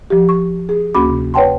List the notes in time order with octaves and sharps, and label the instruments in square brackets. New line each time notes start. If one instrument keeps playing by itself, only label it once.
[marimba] F3 G4
C#6
G#4
D2 A#3 C#4 F#4 B5 D6
C3
B4 C#5 F#5 G5 A5 C6